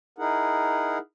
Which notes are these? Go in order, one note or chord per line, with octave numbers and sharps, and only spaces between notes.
D#4 E4 G#4 A#4 F#5